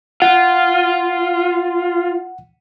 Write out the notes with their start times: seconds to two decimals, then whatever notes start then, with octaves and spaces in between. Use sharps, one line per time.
0.22 F4 F#5